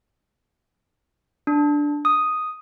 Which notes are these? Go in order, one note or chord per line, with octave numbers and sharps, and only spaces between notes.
D4
D#6